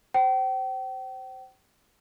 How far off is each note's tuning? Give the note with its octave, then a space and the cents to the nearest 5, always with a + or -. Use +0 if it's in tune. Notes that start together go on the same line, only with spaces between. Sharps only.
C5 +0 G5 -40